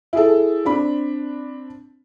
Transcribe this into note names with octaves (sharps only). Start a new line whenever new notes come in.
E4 G#4 A4
C4 D4 B5